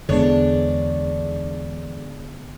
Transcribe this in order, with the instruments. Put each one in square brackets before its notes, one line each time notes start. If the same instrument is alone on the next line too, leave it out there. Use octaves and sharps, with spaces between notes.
[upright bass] E2 [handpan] D3 G#3 B3 [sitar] D4 C#5